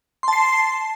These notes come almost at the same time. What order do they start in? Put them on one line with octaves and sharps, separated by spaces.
C6 A5 C7